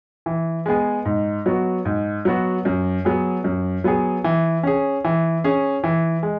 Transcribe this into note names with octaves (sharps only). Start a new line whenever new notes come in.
E3
G#3 B3 G#4
G#2
F#3 B3 F#4
G#2
F#3 B3 F#4
F#2
F#3 B3 G#4
F#2
F#3 B3 G#4
E3
C#4 G#4
E3
C#4 G#4
E3
G#3